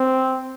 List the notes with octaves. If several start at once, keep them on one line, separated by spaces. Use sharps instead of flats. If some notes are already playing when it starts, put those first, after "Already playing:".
Already playing: C4